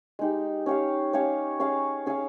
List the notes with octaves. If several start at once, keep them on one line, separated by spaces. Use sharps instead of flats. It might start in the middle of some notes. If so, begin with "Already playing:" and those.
G#3 D#4 G4
C#4 G4 C#5 F5
C#4 G4 C#5 F5
C#4 G#4 C#5 F5
C#4 G#4 C#5 F5